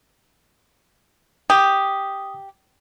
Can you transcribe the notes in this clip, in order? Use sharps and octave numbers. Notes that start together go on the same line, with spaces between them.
G4 D#6